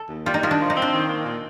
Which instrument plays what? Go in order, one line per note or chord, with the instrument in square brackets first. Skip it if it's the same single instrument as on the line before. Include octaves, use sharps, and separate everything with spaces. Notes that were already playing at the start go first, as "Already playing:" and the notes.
Already playing: [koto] A4
[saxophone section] D#2
[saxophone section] G3 [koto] F4
[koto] D#4
[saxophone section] D#3 [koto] F4
[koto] D4
[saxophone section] F3
[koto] D#4
[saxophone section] C4
[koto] D4
[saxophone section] D#3
A#3
A#2